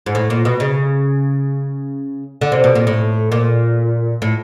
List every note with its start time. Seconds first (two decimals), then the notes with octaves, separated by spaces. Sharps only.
0.06 G#2
0.15 A2
0.30 A#2
0.45 B2
0.60 C#3
2.41 D3
2.52 C3
2.64 B2
2.75 A#2
2.87 A2
3.32 A#2
4.22 A2